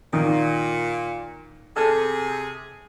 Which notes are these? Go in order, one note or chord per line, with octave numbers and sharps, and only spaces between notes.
A#2 D#3
C3 G#4 A4